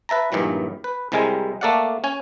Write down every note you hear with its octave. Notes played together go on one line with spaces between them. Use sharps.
B4 E5 A5 A#5
A#1 G2 D#3 E3 F#3
B4
C2 C3 G3 G#3 A#4 G#5
A3 A#3 A4 D5 F5 F#5
C#4 G#5